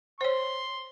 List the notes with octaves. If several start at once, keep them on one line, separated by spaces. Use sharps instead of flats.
C5 C#5 C6